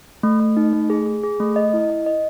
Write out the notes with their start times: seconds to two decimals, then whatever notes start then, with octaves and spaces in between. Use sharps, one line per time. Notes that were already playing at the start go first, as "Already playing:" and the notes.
0.23 A3
0.40 A3
0.57 D#4
0.73 A3
0.90 G#4
1.06 G#4
1.23 G#4
1.40 A3
1.56 D#5
1.74 E4
1.90 D#5
2.06 D#5